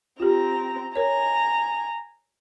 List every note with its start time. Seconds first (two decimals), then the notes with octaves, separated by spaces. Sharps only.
0.20 C4 F4 G4 A#5
0.96 A#4 C#5 G#5 A#5